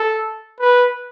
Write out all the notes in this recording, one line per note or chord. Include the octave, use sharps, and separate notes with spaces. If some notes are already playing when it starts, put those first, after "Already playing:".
Already playing: A4
B4